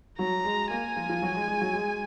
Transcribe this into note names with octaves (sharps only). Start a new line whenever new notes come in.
F#3 F#4 A#5
G#3 G#4
A#3 A#4 G#5
F3 F4
F3 F4
F#3 F#4
G#3 G#4
G#3 G#4
F#3 F#4
G#3 G#4